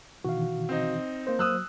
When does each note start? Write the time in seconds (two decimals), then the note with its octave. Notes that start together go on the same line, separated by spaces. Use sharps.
0.24 B2 D#3 E3 F#4 F5
0.69 C4 D#4
1.27 A#3 C5
1.39 F#3 D#6 E6 F#6